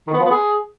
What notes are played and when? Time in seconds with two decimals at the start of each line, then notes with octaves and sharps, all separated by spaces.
0.07 D#3
0.13 B3
0.19 F3
0.25 B3
0.31 G#4